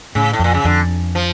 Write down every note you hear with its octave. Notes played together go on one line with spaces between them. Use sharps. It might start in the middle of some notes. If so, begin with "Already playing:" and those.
A2 C#3
A2
F2 A#2
C#3
F2 D3
F3